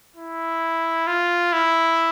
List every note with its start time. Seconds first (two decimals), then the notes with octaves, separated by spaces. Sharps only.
0.16 E4
1.07 F4
1.53 E4